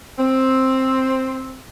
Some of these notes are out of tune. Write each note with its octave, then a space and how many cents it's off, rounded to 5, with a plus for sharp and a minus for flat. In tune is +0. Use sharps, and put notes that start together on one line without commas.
C4 +5